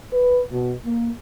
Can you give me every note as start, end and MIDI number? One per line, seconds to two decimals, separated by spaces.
0.12 0.42 71
0.52 0.73 47
0.85 1.10 58